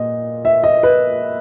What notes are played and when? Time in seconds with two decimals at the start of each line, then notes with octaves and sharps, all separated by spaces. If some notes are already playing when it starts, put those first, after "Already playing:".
Already playing: A#2 D#5
0.45 E5
0.64 D#5
0.83 B4